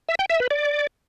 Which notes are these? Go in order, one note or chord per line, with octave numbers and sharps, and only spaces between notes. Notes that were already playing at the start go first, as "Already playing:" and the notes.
E5
G5
E5
B4
D5